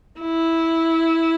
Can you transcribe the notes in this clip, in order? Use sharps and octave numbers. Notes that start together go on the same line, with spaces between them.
E4